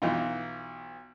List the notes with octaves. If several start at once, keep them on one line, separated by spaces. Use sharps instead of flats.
B1 E3 D#4 F4